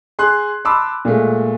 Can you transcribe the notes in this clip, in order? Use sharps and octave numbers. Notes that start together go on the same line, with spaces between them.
G#4 C6 F#6
A5 B5 C6 D6 E6
A#2 G#3 A3